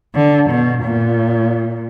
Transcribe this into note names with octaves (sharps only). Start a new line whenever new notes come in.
D3
B2
A#2